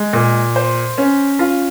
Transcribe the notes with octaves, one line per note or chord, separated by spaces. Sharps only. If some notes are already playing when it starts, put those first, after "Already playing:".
Already playing: G#3
A#2
C5
C#4
F4